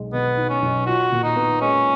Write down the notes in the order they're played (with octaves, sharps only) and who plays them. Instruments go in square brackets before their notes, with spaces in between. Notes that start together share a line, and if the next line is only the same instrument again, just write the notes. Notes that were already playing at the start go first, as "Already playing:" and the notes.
Already playing: [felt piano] B1 G#3
[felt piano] B2 [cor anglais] B3
[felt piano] D#4
[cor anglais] C#4
[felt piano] B1
[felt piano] F4 [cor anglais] F#4
[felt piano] A#2
[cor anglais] D#4
[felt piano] B3
[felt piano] G#3 [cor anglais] C#4